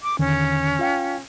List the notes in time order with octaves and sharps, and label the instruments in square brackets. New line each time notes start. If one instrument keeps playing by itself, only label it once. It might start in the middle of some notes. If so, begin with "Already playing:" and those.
[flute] D6
[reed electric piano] E2 D3 D#3 [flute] C#4
[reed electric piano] F4 F5 G5